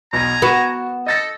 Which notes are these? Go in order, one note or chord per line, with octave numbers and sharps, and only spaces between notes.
B1 E2 G#5 A#5
B3 F#4 C#6 E7
A4 D#5 A6 A#6